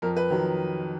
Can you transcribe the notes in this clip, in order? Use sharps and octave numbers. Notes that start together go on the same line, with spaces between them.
F2 A#4
B4
D#3 F#3